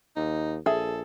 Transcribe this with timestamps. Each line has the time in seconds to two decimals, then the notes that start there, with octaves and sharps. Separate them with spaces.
0.16 D#2 D#4
0.66 A#1 G#4 A4 E5